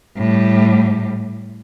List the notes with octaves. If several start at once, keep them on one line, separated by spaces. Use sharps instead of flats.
A2 G3